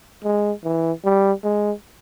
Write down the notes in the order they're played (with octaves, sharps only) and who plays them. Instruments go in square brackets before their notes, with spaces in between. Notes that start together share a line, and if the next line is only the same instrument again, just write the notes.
[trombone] G#3
E3
G3
G#3